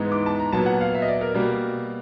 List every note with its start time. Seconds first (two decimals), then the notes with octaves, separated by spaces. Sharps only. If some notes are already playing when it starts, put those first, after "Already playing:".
Already playing: G#2 E3 G#3 B3
0.12 D6
0.26 A5
0.40 A#5
0.52 A#2 F#3 B3 A5
0.66 F#5
0.81 F5
0.95 E5
1.02 D#5
1.08 D5
1.21 A#4
1.34 B2 G3 A#3